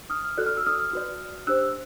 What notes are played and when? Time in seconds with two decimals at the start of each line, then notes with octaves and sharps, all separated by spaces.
0.10 D#6 F6
0.37 F#4 A4 D5 F#6
0.46 F6
0.57 E6
0.66 D#6 F6
0.93 F#4 B4 D5
1.47 D4 G4 C5 E6 F#6